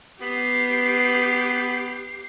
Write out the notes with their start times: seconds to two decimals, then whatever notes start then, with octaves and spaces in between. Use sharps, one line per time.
0.21 B3 G4 C7